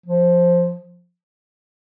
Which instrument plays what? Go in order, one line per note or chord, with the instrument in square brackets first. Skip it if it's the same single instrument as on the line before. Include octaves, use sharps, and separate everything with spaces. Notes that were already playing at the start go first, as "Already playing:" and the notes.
[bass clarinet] F3